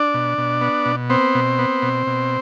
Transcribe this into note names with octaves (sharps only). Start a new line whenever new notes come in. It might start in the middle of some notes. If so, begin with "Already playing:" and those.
Already playing: D4 D5
B2
B2
B3
B2
B3 C4 C5
B2
B3
B2
B2